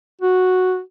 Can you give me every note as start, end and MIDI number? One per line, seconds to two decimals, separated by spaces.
0.21 0.80 66